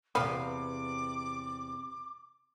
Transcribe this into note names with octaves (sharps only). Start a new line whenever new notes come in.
E2 C3 B3 F5 D6